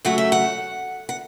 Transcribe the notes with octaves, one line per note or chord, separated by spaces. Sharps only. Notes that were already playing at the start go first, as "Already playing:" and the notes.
C#3 F#3 A3 F#5
E5
F#5
F#5